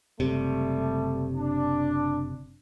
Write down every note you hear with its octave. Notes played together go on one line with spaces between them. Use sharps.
F#1 C3 G3 A3
D4